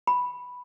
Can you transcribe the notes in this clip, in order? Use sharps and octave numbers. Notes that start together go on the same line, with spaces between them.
B5